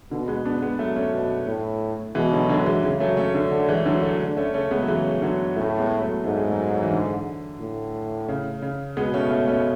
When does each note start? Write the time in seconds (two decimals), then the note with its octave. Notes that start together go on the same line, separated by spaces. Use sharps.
0.11 B2 D3
0.28 G#3 B3
0.45 B3 D4
0.62 G#3 B3
0.79 F#3 A3
0.96 A3 C#4
1.13 B2
1.47 A2
2.15 B2 E3 G#3
2.32 D3 F#3
2.49 D3 F#3
2.66 E3 G#3
2.83 C#3 E3 G#3
3.00 F#3 A3
3.17 A3 C#4
3.35 D3
3.51 D3
3.69 E3 G#3
3.85 D3 E3 F#3
4.03 F#3 A3
4.20 D3
4.37 A3 C#4
4.54 C#3 A3 C#4
4.71 G#3 B3
4.82 F#3
4.88 E3 G#3
5.22 D3 F#3
5.56 A2 A3 C#4
5.70 A3
5.79 G#3 B3
6.01 F#3 A3
6.24 G#2 A3
6.37 G#3
6.50 F#3 A3
6.73 F#3
6.82 E3
6.93 D3
7.60 A2
8.28 C#3
8.62 C#3
8.97 B2 G#3 B3
9.14 A3 C#4
9.31 A3 C#4
9.48 A3 C#4